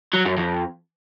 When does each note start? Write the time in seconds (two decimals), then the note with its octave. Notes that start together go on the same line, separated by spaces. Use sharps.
0.14 F#3
0.26 F#2
0.37 F2